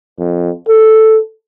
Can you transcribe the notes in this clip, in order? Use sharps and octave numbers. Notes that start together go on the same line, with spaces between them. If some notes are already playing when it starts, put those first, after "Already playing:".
F2
A4